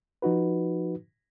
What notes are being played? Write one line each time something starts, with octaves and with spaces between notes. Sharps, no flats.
F3 D#4 F#4 B4